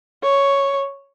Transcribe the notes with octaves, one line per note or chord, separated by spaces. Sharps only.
C#5